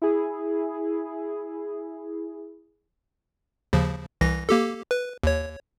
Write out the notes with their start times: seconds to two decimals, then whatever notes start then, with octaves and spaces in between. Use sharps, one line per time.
0.02 E4 G#4
3.73 D#2 C#3 F3
4.21 C2 E3 A#6
4.49 A#3 G4 A4
4.91 B4
5.23 D#2 C#5